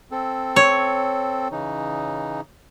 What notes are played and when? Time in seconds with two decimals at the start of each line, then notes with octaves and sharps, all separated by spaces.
0.11 C4 A4
0.56 C#5
1.52 C#3 E3 D#4